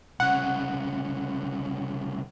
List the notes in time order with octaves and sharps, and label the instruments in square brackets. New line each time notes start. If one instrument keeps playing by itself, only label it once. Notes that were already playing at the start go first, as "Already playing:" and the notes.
[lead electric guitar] C2 C#3 [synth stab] F#5